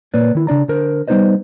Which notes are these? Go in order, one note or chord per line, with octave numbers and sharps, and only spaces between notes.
A#2 A#3 B4 C#5 D5
D#3 E4
C#3 D4 D5 A#5
D3 A#4 C5
G3 B3 D#4 B4 C5 D#5